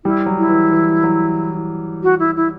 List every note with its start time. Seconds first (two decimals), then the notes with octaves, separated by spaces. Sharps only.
0.05 G3 E4
0.26 F#3
0.38 E4
0.48 E3
0.70 E3
1.03 F#3
2.03 F#4
2.19 E4
2.36 E4